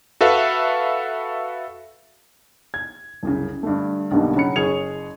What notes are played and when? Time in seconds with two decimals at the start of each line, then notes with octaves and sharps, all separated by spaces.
0.21 F#4 A4 B4 E5 F5
2.74 G#6
3.23 C2 F#2 C#3
3.63 G2 D3 A3
4.11 B1 G2 B2 D3 G3 A#3
4.35 C#3 F#3 F#5 B5 C#7
4.56 F#1 G#4 C#5 G#6 C#7 F7